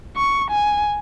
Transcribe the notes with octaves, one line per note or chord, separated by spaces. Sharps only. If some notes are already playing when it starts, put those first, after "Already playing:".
C#6
G#5